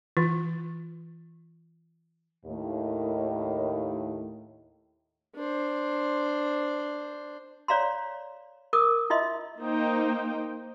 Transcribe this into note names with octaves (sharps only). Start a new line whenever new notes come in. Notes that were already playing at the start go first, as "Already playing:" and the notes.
E3 F4
D#2 A2
D4 C5
C#5 D5 F5 A#5 C6
A#4 D6 D#6
E4 F4 D#5 E5 C6
A#3 D#4 C5 G5